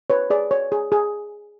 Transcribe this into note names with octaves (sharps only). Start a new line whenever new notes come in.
B4 C#5
G#4 D5
C#5
G#4
G#4